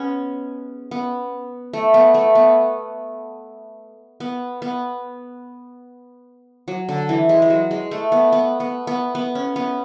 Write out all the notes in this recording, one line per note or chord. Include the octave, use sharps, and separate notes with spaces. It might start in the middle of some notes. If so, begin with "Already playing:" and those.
Already playing: G#3 B3 C#4
B3
A3
B3
A3
B3
B3
B3
F#3
D3
E3
G#3
G#3
F#3
G#3
A3
B3
B3
B3
B3
B3
C#4
B3